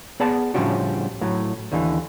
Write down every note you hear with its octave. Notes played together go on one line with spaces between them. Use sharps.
B3 G#4 D5 F#5 A5
A2 C#3 F3 G3 D4 F#4
A2 F#3
D#2 D3 E3